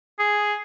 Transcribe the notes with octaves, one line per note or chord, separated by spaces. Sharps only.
G#4